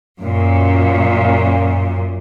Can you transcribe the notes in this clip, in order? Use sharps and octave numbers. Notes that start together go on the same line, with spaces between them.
F#2 A#2